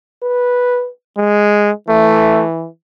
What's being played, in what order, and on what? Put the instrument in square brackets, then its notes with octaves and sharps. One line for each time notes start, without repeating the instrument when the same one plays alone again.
[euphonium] B4
G#3
[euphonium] E3 [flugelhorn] A3